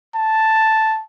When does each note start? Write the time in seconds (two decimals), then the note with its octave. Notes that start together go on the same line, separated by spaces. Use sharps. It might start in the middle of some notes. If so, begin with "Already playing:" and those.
0.15 A5